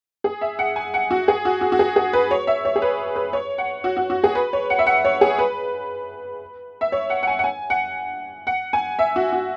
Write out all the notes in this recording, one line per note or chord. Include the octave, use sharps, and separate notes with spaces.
G#4
E5
F#5
G#5
F#5
F#4
G#4
F#4
F#4
F#4
G#4
G#4
B4
C#5
E5
C#5
G#4
B4
B4
C#5
F#5
F#4
F#4
F#4
G#4
B4
C#5
F#5
E5
F#5
C#5
G#4
B4
E5
C#5
F#5
F#5
G#5
F#5
G#5
F#5
F#5
G#5
E5
F#4
F#4